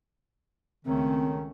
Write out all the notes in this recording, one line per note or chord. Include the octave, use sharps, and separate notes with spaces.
C#2 D#3 A3 C4 C#4